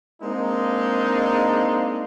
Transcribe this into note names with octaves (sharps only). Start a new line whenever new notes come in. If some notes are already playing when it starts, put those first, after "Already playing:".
G#3 A#3 C4 D4 D#4